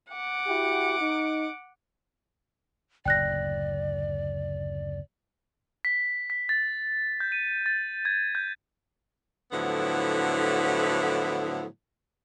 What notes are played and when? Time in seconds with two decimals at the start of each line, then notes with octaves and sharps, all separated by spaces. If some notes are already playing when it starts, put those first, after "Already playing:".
0.14 F#5 D6
0.47 E4 F#4 G4
1.00 D#4
3.05 F#1 D2 A2 D5 G5 F#6 A#6
5.85 B6
6.30 B6
6.49 A6
7.20 G6
7.32 D#7
7.66 A6
8.05 G#6
8.35 G6
9.52 A2 D3 F3 F#3 B3 E4